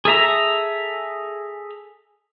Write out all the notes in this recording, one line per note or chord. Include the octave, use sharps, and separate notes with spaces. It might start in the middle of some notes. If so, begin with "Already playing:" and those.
G#4 A4 E5 A#5